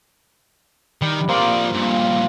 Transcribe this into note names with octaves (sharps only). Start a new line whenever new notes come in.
D#3 G3
F3 A#3 C4 F4 D5
G2 A#2